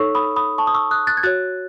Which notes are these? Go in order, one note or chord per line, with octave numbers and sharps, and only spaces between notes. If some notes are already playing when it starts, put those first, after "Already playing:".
Already playing: D#4 A4 C#5 C#6 E6
B5 D#6
B5 D#6
A5 C#6
D#6
C#6 E6
D#6 F#6
F#6 A6
G#6
F#4 C#5 F#6 A6